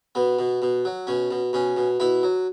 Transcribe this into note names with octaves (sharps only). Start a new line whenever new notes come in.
B2 B3
B2
B2
F#3
B2 C#4
B2
B2 C#4
B2
B2 E4
F#3